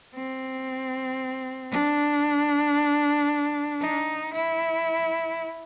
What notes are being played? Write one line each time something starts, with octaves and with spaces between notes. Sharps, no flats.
C4
D4
D#4
E4